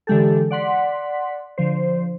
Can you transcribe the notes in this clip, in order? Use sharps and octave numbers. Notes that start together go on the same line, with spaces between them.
D3 E3 G#3 G4 A4
D5 F#5 C6 B6
D3 F3 C5